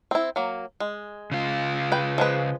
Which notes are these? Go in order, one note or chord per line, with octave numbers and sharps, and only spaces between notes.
C4 E4
F#3 A#3
G#3
C#3 F4
B4 G5
F3 G#3 B4